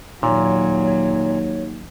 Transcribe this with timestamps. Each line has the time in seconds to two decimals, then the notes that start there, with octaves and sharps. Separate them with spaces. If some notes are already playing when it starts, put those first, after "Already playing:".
0.23 D#2 A#2 F#3 C#5